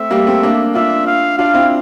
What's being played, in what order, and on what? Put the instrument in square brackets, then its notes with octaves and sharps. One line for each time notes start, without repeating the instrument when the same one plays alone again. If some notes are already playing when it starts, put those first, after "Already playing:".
Already playing: [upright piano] A3 C4 [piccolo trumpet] E5
[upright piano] G3 A#3
A3 C4
A#3 D4
[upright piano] D4 F4 [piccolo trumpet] E5
[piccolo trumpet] F5
[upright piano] D4 F4 [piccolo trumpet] F5
[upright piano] C4 E4